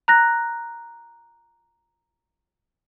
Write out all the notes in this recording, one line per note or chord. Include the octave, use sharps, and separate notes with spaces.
A#5 F#6 A#6